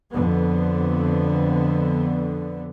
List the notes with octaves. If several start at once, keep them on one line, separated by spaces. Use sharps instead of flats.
F2 D3 B3